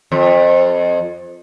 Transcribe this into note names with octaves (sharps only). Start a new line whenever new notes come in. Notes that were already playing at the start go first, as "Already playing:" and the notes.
F2